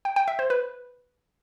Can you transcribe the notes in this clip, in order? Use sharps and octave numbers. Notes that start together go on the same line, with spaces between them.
G5
G5
E5
C5
B4